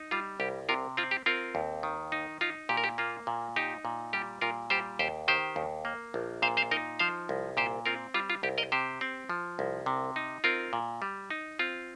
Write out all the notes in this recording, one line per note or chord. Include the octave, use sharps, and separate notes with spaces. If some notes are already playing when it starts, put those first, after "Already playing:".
Already playing: D#4
G3 F4
C2 G4
C3 F4 A#4
C4 F4
G4
C4 F4 A#4
D#2
D#3
D#4
D#4 F4
A#2 G4
A#4
G4
A#3 F4
A#2
D#4 G4
A#2
G3 G4
A#2 F4 A#4
G3 G4 C5
D#2 G4 C5
D#3 G4 C5
D#2
A#3
A#1
A#2 C5 F5
C5 F5
D#4 A#4 D#5
F3 C5 F5
C2
A#2 G4 C5
C4 F4 A#4
G3 F4
F4
C2 G4
A#4 D#5
C3 G4 C5
C4
F3
C2
C3
D#4
C4 F4 A#4
A#2
G3
D#4
C4 F4